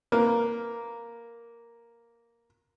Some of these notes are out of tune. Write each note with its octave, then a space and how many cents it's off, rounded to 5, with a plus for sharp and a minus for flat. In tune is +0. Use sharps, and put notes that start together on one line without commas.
A#3 +0 B4 +15